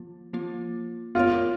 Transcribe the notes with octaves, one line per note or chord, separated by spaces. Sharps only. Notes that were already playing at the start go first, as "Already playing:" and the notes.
Already playing: F3 A#3 F4
F3 A#3 F4
B3 F4 F#4 A#4 C#5